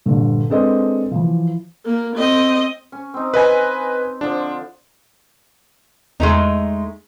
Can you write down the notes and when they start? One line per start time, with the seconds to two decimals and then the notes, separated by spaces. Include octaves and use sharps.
0.06 A#1 G2 D3
0.50 G#3 C4 D4 A4 B4 D#5
1.11 E3 F3
1.86 A#3
2.17 C4 D#5
2.92 C#4
3.14 C4 D#4
3.34 B4 D#5 G#5
4.21 D3 F3 D4
6.20 E2 G#3 A3 D#4